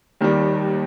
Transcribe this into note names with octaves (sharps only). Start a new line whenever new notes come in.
D#2 D#3 G3